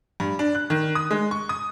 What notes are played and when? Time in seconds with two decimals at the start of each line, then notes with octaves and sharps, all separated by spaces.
0.20 G2
0.39 D4
0.55 F#6
0.70 D#3
0.95 D#6
1.11 G#3
1.31 C#6
1.49 D#6